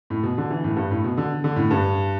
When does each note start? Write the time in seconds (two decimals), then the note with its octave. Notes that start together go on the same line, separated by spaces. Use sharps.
0.10 A2
0.23 B2
0.38 D3
0.51 E3
0.64 A2
0.76 G2
0.91 A2
1.04 B2
1.17 D3
1.44 D3
1.56 A2
1.71 G2